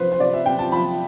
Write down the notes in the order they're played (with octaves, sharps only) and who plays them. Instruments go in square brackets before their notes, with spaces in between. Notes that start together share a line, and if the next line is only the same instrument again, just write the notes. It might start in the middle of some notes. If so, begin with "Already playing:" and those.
Already playing: [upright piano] C3 F3 B4 C5
C5
C3 D5
E5
C3 G5
A5
F3 B5